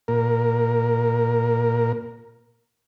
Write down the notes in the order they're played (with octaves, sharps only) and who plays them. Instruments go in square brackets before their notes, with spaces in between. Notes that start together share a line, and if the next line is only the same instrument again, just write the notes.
[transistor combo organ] A#2 A#4